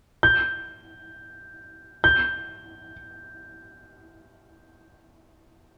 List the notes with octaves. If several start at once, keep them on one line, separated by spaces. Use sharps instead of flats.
G6
G6